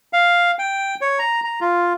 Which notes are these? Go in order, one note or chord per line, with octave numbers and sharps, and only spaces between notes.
F5
G5
C#5
A#5
A#5
F4